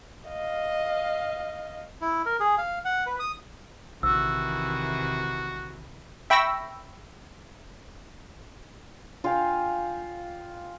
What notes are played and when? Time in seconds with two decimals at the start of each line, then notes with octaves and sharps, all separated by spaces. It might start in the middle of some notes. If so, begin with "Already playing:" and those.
0.29 D#5 F5
2.01 E4
2.26 A#4
2.40 G#4
2.58 F5
2.85 F#5
3.06 B4
3.19 D#6
4.03 A#1 C3 D#3 E3 F#4 E6
6.30 E5 G5 B5 C#6 E6 A#6
9.24 F4 F5 G5 G#5